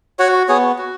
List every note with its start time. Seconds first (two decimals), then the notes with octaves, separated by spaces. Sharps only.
0.19 F#4 C#5 F#5
0.48 B3 G#4 C#5
0.78 F#4